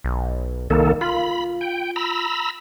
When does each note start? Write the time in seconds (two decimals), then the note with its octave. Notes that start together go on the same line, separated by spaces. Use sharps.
0.04 B1
0.70 C2 D#3 A#3 A4
1.01 F4 B5
1.61 G5
1.96 A#5 B5 E6